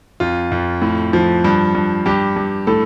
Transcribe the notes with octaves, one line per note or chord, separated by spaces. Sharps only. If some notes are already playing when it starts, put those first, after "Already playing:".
F2 F4
F2
A2
F3
G2
G2
G2 G4
G2
A2 A4